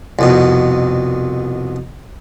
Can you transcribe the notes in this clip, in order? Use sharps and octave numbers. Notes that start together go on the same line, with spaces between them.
C2 F2 B2